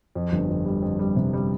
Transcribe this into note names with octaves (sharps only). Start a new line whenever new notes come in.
F2
G1
F2
G3
F2
G3
C3
G3